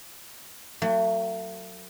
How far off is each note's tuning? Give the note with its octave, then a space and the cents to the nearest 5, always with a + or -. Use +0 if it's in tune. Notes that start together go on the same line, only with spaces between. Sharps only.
F#3 +0 A3 +40